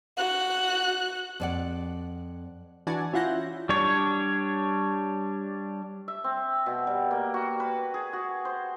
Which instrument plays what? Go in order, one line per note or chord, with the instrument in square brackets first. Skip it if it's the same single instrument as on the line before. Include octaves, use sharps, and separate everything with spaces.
[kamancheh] F#4 F#6
[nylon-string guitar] F2 D5 F#5
[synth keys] E3 D4 F#4 D5 G#5 A5
C#4 E4 F4 F#5 G6 A#6
[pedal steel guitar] G3 D4 C#5
[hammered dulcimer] E5
C4
B2
G3
A#3
F#4
B4
G#4
F#4
C5